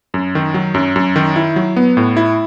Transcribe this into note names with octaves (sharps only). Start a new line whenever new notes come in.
F#2
D#3
F#3
F#2
F#2
D#3
E4
F#3
B3
A2
E4